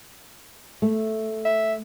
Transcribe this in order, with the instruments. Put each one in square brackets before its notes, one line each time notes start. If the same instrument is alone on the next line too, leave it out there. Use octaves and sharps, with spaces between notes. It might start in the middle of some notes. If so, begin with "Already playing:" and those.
[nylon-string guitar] A3
[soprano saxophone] E5